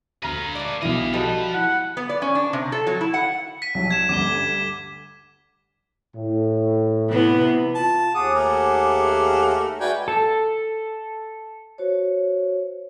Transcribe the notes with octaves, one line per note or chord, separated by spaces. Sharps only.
D2 B4 F5 A#5 A#6
A3 D5
B1 E3 E4 D#5 F5
F3 G3 F#4 A4 B4 D#5
E4 F#5
B3
D5
C#4
D4
C3
A4
F#3
E4
F#5
B6 D#7
C2 F#3
G#6 E7
D2 G2 D6 D#7 G7
A2
C3 E3 B3
F4 A5
D#2 G#4 F#5 D6 D#6
A3 A#4
G#3 F#4 B4 D5 E5 G5 G#5
A4
F#4 C5 C#5